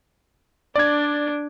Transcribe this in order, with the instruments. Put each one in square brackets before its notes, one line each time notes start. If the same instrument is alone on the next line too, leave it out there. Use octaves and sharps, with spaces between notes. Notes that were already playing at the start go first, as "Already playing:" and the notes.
[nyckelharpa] D4 [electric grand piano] D5 G#6